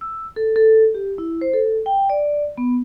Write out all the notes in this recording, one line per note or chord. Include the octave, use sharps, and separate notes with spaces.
E6
A4
A4
G4
E4
C5
A4
G5
D5
B3